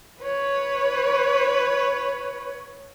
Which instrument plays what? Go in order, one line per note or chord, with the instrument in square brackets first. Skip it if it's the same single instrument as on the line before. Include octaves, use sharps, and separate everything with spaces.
[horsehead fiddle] B4 C#5